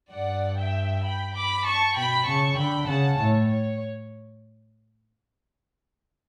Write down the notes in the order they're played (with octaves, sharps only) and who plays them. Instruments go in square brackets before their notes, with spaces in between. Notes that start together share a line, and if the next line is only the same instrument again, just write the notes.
[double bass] G2 [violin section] D5 F#5
[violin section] E5 G5
G5 B5
B5 D6
A5 C#6
[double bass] B2 [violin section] G5 B5
[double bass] C#3 [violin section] A5 C#6
[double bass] D3 [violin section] G5 B5
[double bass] C#3 [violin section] F#5 A5
[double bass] A2 [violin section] C#5
[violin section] C#5